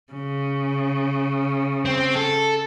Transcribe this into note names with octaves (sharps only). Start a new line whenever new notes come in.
C#3
C4
A4